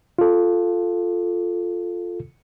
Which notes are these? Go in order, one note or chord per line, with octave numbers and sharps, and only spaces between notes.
F4 A4